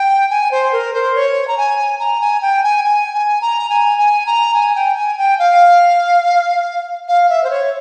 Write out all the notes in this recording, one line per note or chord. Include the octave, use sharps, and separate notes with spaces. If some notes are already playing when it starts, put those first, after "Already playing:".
Already playing: G5
G#5
C5
A#4
C5
C#5
A#5
G#5
A#5
G#5
G5
G#5
G#5
G#5
A#5
G#5
G#5
A#5
G#5
G5
G#5
G5
F5
F5
E5
C5
C#5